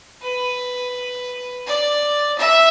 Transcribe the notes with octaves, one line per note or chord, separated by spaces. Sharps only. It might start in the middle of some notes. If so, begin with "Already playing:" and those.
B4
D5
E5